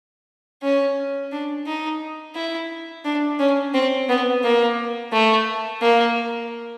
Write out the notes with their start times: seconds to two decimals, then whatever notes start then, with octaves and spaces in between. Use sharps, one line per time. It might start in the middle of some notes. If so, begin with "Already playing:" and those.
0.62 C#4
1.32 D4
1.66 D#4
2.35 E4
3.05 D4
3.39 C#4
3.74 C4
4.09 B3
4.43 A#3
5.12 A3
5.81 A#3